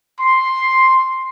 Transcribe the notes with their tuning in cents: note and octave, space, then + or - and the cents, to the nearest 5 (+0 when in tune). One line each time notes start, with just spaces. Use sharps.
C6 +5